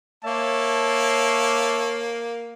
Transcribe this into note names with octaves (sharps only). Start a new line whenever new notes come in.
A#3 C#5 E5 A5